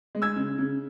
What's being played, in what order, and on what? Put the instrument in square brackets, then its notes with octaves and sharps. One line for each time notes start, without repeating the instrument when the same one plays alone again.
[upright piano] G#3
E6 G#6
C#3
C#3